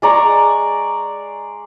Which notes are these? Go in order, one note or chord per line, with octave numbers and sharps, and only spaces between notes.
G#3 D5 A#5 C#6